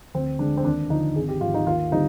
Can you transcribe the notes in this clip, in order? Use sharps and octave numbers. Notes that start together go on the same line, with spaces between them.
D2 C4
D3 G#3 D4
C4
D#2 D4
D3 F3 D#4
G#1 G#4
G4
G#2 F3 F4
D#4
D#2 F4
D3 G3 C4 D#4